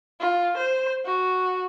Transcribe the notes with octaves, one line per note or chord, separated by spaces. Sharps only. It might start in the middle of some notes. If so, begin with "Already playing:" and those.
F4
C5
F#4